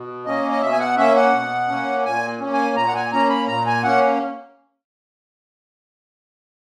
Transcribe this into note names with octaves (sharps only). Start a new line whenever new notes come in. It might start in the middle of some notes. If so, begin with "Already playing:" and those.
Already playing: B2
A#3 C#4 D#5
D#5
B2 E5
G#5
F#5
A#3 C#4 E5
F#5
B2
A#3 C#4
A#2 G#5
A#3 C#4
G#5
A#2 A#5
F#5
G#5
A#3 C#4 A#5
B5
A#2 A#5
G#5
A#3 C#4 F#5